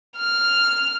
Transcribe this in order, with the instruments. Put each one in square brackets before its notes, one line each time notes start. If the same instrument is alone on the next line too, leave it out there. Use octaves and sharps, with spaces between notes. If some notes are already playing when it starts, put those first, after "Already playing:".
[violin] F6